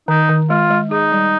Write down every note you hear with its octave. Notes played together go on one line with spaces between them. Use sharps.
D#3 D#4
D#3
G#3 F4
G#3
D#4 G#4
G3